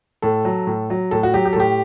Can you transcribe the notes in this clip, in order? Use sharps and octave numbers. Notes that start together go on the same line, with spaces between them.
A2 A4
F#3
A2
F#3
A2 A4
F#4
F#3 G4
G4
A4
A2 G4